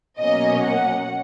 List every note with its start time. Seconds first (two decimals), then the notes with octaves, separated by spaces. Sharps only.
0.18 B2 F#3 A#3 C#4 D#5
0.61 F#5